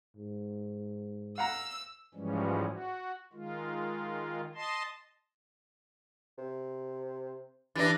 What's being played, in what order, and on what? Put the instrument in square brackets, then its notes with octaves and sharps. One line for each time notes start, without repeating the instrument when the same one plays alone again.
[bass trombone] G#2
[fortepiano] F5 F#5 A#5 [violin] E6
[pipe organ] G#2 E3 F3 G3 G#3 C#4
F#4
D#3 G#3 F4
D#5 A5 C6
[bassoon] C3
[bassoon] G2 [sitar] E3 D4 [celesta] A6 A#6